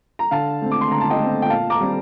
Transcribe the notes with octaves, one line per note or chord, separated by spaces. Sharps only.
A#5
D3 F5 A5
A3 C4
D6
C6
D3 A#5
A5
D#5 G5
A3 C4
G5
A#2 F5 A5
A#5 D6
G3 C4